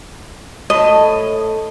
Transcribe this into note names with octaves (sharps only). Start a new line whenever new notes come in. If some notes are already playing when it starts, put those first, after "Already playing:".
A2 D#5